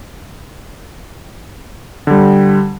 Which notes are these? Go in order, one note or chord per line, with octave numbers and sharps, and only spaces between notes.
D3 G3